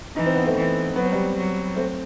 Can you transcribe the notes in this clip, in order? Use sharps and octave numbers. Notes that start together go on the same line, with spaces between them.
E3 D#4
C4
B3
A3 C4
E3
F#3 B3
C4
G3 B3
F#3
A3 C4